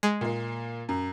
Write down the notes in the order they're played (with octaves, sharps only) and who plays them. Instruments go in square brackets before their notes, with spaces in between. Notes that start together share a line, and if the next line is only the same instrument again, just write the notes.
[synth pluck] G#3
[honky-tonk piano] A#2 A#3
F#2